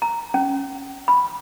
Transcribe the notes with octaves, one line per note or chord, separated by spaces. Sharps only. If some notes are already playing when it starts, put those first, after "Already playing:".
A#5
C#4
B5